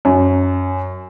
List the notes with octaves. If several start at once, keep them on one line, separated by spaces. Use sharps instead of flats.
F#2